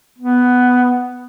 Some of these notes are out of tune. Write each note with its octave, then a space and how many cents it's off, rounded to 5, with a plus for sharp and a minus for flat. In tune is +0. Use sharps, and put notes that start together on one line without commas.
B3 +5